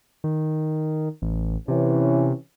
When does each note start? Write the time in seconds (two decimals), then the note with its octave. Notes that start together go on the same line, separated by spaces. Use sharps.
0.24 D#3
1.22 A1
1.68 C3 E3 C#4